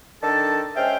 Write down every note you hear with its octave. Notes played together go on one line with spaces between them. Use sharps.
D#3 D4 A4 A5
G#3 C#4 C5 E5 F5 G5